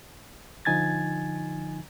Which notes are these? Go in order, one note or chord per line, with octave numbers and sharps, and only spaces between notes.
D3 F3 D#4 G#5 G#6 A6